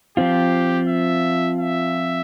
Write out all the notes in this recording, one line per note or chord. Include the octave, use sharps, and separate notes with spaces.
F3 C4 F4 G4
E5
E5